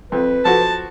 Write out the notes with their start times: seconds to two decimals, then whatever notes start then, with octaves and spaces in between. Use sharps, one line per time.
0.12 F2 B4
0.45 F3 F#4 A4 A5